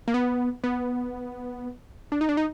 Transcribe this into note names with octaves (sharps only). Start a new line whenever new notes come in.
A#3
B3
B3
D4
D#4
D4
D#4